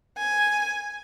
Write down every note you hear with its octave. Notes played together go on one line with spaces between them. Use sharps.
G#5